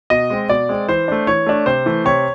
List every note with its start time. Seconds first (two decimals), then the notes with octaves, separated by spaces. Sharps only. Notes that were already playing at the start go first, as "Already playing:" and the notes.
0.10 B2 D#5
0.30 G#3 C4
0.49 B2 D5
0.69 G#3 C4
0.88 E3 C5
1.08 A3 D4
1.27 E3 C#5
1.46 A3 D4
1.66 C3 C5
1.86 E3 A3
2.05 C3 C#5